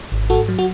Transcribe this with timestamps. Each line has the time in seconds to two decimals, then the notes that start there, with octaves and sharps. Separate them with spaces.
0.12 G#1
0.30 G#2 F#4 A4
0.48 F#3
0.59 F#4